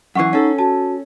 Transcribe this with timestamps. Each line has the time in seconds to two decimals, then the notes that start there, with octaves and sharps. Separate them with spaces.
0.15 F#2 E3 F#5 C#6 C7
0.33 C#4 D#4 A4
0.59 F#4 A5